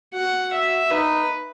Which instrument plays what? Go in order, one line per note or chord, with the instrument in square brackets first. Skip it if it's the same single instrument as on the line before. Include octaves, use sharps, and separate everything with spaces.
[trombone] F#4 [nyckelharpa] F#5
[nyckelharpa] E5
[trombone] D#4 [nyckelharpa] B4